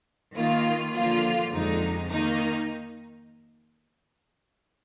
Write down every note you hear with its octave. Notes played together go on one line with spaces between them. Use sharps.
D#3 A#3 F4
D3 F3 A#3 F4
F2 D3 G#3 D#4
D#3 A#3 D#4